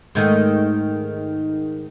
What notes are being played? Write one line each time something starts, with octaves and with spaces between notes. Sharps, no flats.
G#2 D#3 A3